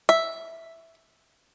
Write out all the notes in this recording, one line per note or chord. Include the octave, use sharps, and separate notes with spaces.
E5